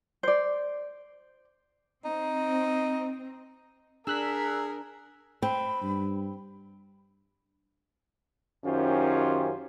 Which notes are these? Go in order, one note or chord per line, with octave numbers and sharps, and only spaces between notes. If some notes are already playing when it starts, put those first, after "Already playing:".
C5 D5
C4 D#4
D4 G#4 A#4 E6 F#6 B6
C4 B5
G2
F#2 D#3 C#4 F4 G4 C5